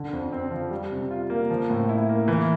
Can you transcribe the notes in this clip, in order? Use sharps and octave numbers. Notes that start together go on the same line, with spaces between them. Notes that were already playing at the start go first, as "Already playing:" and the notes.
Already playing: D3
F2
C4
F3
G3
C3
F4
A#3
F3
A2
E4
A#3
E3